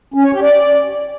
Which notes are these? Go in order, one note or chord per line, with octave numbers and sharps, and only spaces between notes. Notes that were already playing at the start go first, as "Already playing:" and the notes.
C#4
C#5
G4
D5